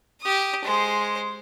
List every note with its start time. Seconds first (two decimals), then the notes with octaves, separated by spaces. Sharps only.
0.22 G4 D#6
0.64 G#3 C5